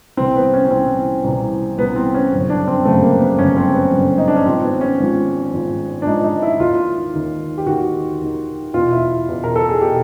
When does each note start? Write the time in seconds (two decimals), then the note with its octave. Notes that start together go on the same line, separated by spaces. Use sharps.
0.17 C2 C3 E3 C4
0.36 B3
0.54 C#4
0.64 C#4
0.71 C2 C3 E3 C4
1.24 C2 C3 E3
1.78 C2 C3 E3 B3
1.96 C4
2.14 C#4
2.32 G1 F#2 C#3
2.50 D4
2.68 C4
2.85 G1 F#2 C#3 A3
3.03 A#3
3.21 B3
3.39 G1 F#2 C#3 C#4
3.57 C4
3.74 B3
3.92 G1 F#2 C#3
4.18 D#4
4.28 D4
4.36 C#4
4.45 G#1 G#2 F3 C4
4.63 B3
4.81 C#4
4.99 G#1 G#2 F3
5.53 G#1 G#2 F3
6.02 D4
6.06 G#1 G#2 F3 D#4
6.24 D#4
6.42 E4
6.60 D#2 D#3 F4
7.14 D#2 D#3
7.58 G4
7.67 D#2 D#3 F#4
8.21 D#2 D#3
8.74 E2 B2 F4
8.92 E4
9.28 E2 B2
9.44 A#4
9.56 A4
9.69 G#4
9.81 B2 G4